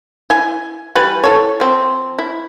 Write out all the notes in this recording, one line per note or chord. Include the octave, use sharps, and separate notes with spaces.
E4 G#5
E3 G3 B4
E4 A4 C#5
F3 C4
E4